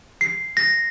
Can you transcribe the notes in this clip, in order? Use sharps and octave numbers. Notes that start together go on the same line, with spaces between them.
C7
A#6